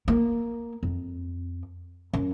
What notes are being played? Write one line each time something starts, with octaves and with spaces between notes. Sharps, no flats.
A#3
F2
F#2